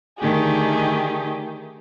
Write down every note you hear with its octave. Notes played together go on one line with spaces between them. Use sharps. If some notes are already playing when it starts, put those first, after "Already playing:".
D3 D#3 A3 D#4 G4 G#4